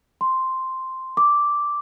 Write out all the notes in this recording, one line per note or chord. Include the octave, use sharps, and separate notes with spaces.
C6
D6